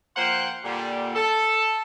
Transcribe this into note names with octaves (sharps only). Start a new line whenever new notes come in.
F3 A#3 C5 F#5 G5 C6
A#2 D3 G3
A4